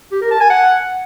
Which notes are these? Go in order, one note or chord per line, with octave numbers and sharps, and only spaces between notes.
G4
A#4
A5
G#5
F#5